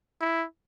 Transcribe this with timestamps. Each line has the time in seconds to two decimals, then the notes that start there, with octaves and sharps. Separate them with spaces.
0.21 E4